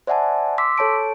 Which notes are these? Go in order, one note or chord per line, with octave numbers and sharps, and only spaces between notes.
C5 D5 E5 F#5 G#5 A5
C6 D6 E6 B6
A4 C#5 A5 D7